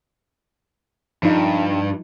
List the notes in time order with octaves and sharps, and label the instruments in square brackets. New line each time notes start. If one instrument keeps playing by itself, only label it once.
[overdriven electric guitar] G2 [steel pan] F3 D#4